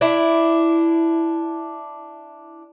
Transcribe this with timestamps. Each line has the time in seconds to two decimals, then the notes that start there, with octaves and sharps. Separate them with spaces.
0.01 D4 E4